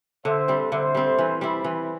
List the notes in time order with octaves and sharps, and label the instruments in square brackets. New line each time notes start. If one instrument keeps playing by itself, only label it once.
[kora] D3 [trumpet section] C5 E5
[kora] G3 C4
[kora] D3 [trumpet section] C5 E5
[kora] G3 C4
E3
G3 C4 E4
E3